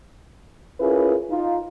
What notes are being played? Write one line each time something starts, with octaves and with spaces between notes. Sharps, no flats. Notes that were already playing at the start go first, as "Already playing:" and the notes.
C#4 E4 F4 G#4 A#4 B4
D#4 F4